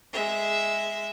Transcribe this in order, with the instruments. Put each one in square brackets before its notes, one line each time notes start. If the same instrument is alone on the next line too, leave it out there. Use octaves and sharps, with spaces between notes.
[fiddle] G#3 E5